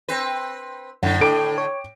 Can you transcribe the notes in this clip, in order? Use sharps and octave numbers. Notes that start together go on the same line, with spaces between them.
C4 B4
F#2 A2 D3 F#5
A4 G5 D6 D7
C#5